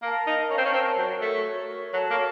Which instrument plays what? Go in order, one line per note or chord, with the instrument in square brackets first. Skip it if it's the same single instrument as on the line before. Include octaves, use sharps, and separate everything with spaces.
[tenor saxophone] A#3 [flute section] A#4 F5 A5
[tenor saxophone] D#4
[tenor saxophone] C#4 [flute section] A#4 F5 A5
[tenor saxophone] C4
C#4
C4
[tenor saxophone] F#3 [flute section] F#4 A#4 C#5
[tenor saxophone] A3
[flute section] F#4 A#4 C#5
[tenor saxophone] F#3 [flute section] F#4 A4 C#5 A5
[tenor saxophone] A#3